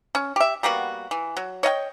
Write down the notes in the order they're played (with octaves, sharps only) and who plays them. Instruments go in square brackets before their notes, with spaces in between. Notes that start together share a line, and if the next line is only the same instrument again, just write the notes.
[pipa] C#4
G4 E5
G3 A#3 B3 F#4
E3
F#3
C#5 D#5 F5 G5